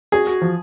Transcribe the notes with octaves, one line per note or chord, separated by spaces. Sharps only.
F#4 G#4
F#4
F3